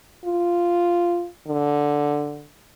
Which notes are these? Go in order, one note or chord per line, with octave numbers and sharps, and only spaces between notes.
F4
D3